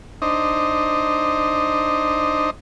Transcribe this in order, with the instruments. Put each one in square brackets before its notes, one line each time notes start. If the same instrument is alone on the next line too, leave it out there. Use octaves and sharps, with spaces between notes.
[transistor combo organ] D4 D#4 C5 D#5